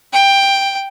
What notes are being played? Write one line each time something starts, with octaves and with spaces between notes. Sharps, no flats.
G5